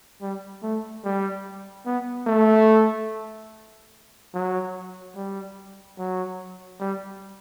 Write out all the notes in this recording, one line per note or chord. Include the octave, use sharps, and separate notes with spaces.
G3
A3
G3
B3
A3
F#3
G3
F#3
G3